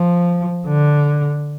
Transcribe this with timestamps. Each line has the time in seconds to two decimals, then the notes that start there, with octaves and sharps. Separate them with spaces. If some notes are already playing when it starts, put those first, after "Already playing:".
Already playing: F3
0.68 D3